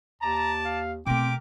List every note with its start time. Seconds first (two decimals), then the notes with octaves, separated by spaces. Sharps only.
0.22 D#2 D5 A5 A#5
0.65 F5
1.06 B2 A3 C4 G4 A#4 G5 D6